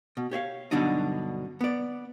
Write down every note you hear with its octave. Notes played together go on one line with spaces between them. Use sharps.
B2
G4 C#5 E5 F5
G2 B2 D3 F#3 D4 D#4
B3 D5